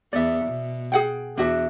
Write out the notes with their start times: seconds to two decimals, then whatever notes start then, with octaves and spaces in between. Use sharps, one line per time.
0.13 E2 B3 D5 E5
0.45 B2
0.92 G#4 F#5 G5
1.38 E2 D4 F#4 E5